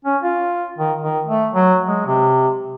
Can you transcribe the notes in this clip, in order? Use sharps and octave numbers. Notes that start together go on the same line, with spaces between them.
C#4
F4
D#3
D#3
A3
F#3
G#3
C3